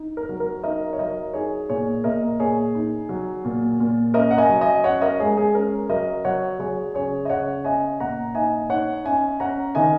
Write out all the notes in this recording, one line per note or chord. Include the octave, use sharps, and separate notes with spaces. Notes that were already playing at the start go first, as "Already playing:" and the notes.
Already playing: D#4
A#4
F#3
A#4
D#4 A#4 D#5
C#5
F#3 A#4 D#5
D#4 G#4 C#5
A#2 G#4 C#5
A#2 A#4 D#5
A#2 G#4 C#5
D#4
F#3
A#2
A#2
C#4 A#4 D#5
F#5
D#5 G#5
F#3
D#5 G#5
C#4 C#5 F#5
A#4 D#5
G#3 G#4 C#5
G#4
C#4 A#4
F#3 A#4 D#5
F#3 C#5 F#5
F#3 G#4 C#5
C#3 G#4 C#5
D#5
C#3 C#5 F#5
C#4 D#5 G#5
A#2 F#5 A#5
D#4 D#5 G#5
D#4 C#5 F#5
C#4 D#5 G#5
C#4 F#5 A#5
D#3 D#5 G#5